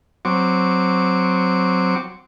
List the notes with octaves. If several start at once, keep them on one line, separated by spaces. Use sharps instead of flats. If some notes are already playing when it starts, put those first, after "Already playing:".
F#3 C4 C#6 D6